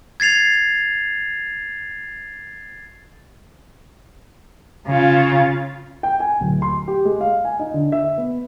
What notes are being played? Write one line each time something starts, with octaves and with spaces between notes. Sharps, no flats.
G#6 A6 C7 F7
C#3 F4
G5
G#5
D1
C6
G4
G#3
F5
G#5
D#4
D3
E5
B3